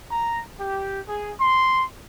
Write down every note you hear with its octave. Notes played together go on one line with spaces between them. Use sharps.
A#5
G4
G#4
C6